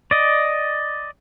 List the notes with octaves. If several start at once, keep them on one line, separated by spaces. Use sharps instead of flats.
D5 D#5